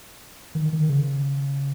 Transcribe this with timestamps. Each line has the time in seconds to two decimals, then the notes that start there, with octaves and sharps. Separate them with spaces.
0.55 D#3
0.73 D#3
0.90 C#3